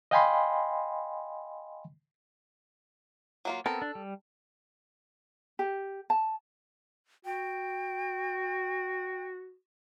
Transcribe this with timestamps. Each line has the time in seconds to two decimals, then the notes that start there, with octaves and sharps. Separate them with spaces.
0.11 D#5 F5 G5 G#5 B5 C6
3.45 F#3 A#3 F4
3.66 B3 C4 A4 A#4
3.82 D4
3.95 G3
5.59 G4
6.10 A5
7.25 F#4 G5